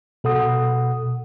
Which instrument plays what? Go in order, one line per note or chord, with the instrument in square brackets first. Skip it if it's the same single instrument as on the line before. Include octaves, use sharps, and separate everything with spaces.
[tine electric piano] B2 A4 F#5 D#6